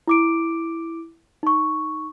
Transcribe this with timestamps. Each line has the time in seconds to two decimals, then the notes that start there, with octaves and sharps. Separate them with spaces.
0.08 E4 D6 D7
1.43 D#4 C#6